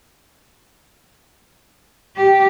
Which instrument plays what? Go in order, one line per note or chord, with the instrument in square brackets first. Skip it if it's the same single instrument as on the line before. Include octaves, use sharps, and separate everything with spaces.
[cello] G4